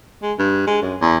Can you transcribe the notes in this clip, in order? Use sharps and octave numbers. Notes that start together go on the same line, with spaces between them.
G#3
G2
G#3
F#2
E2